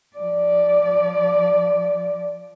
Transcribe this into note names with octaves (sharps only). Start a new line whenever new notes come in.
F3 D5